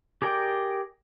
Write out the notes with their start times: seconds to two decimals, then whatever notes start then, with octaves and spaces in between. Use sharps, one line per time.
0.22 G4 G#4 A#4 D5 G5